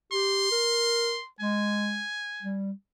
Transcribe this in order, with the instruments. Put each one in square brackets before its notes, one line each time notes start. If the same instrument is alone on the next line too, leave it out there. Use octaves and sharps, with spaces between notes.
[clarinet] G4 [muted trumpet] C6
[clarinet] A#4
[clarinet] G#3 [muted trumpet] G#5
[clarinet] G3